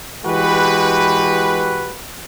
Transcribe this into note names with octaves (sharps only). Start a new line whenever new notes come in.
E3 G#3 F#4 G4 B4